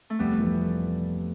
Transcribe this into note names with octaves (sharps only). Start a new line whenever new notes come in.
A3
F1 G3 B3
F2 E3